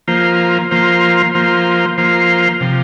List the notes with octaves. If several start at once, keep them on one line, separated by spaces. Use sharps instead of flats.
F3 A#3 F4 C5
F3 A#3 F4 C5
F3 A#3 F4 C5
F3 A#3 F4 C5
C3 F3